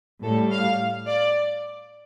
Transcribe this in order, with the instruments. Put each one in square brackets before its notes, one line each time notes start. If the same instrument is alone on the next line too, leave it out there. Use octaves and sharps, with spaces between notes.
[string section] A2 G3 A4
F5
D5